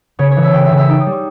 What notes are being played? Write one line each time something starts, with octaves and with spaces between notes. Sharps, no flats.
C#3 C#5
C#5
E3
E5
C#3 G5
E5
C#3
E5
D#4 G5
D#6
G3
C#6